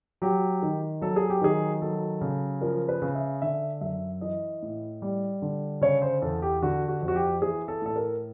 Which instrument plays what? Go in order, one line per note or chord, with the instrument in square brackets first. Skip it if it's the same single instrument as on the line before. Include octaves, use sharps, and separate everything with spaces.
[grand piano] F#3 G4
D#3
F#3 A4
G#4
G4
D#3 G#4
F#3 A4
C#3
F3 A#4
B4
C#3
E5
D3 E5
F#2 E5
E3 D#5
A2
G3
D3
C#3 C#5
C5
E2 A4
G4
D3 F#4
F#4
F2
F#4
G4
E3 G#4
A4
A2 A4
A#4